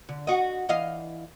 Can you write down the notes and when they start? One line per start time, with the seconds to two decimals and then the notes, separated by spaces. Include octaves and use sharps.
0.09 D3
0.27 F#4 D#5
0.69 E3 D#5 F5